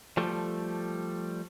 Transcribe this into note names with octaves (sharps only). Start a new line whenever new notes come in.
F3 G3 A3